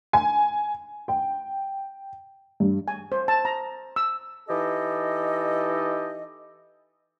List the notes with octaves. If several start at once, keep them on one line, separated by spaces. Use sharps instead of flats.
G#5
G5
G2
G#5
C5
A5
A#5
E6
E3 D#4 G4 A4 D#5